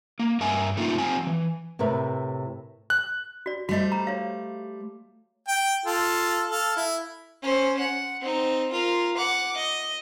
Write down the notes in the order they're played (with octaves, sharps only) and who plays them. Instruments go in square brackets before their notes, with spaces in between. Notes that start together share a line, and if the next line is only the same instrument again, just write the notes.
[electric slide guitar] A#3
G2 A#4 D#5 E5 G#5
A3 A#3 D#4 F4
F3 C4 G#5
E3
[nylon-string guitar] A2 C3 A#4 B4 E5
[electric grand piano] F#6
[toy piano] F#4 D5
[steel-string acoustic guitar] G3 A3 C5 [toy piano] F#4 D#5
[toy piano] A#5
C#5 F5
[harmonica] G5
F4 A4
A4 F5
E4
[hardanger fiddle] C#4 C5
F#5
C4 D#4
F4 A#4
F#5 D6
D#5